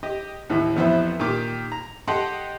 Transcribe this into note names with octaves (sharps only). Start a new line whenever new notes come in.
G4 D#5
D#2 A2 E3
A1 F2 B3 E4 C5 E5
A#2 D#3 G4 D6
A#5
G4 A4 D#5 F#5 C6